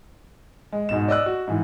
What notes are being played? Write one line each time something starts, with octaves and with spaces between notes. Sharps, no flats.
G#3
G#2 B2 E7
D5 D#5 E6 F#6
F#4
G#2 E3